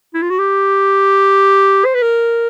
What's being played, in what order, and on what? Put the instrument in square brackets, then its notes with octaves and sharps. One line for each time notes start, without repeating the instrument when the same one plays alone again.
[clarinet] E4
F4
F#4
G4
C5
B4
A#4